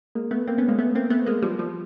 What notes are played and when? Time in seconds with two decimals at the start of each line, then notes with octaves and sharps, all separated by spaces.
0.15 G#3 A#3
0.31 A3 B3
0.47 A#3 C4
0.58 B3 C#4
0.68 G#3 A#3
0.79 A3 B3
0.95 A#3 C4
1.10 A3 B3
1.26 G#3 A#3
1.42 F3 G3
1.59 F3 G3